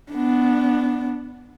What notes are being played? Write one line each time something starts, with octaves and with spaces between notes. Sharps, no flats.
B3 D4